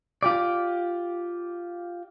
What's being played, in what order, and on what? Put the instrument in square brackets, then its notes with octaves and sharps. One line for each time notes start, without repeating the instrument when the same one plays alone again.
[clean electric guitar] F4 G4 D5